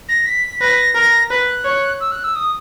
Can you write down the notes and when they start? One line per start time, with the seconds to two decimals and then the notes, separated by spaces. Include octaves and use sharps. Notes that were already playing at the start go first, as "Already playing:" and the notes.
0.08 A#6
0.26 B6
0.60 B4 A#6
0.95 A#4
1.30 B4 F#6
1.65 C#5
2.00 E6
2.11 F#6
2.23 E6
2.35 D#6